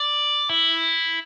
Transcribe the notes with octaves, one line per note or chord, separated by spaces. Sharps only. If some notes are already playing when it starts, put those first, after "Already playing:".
Already playing: D5
E4